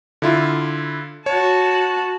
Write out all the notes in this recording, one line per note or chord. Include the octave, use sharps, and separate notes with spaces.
D3 E4 F4
F#4 C#5 A5